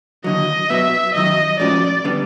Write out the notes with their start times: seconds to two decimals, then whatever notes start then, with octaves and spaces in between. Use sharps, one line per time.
0.24 D#2 D3 F#3 D#5
0.70 B2 F#3 B3 E5
1.15 F#2 D#3 F#3 D#5
1.60 A2 F3 G#3 C#4 F#4 D5
2.04 D3 G3 B3 D4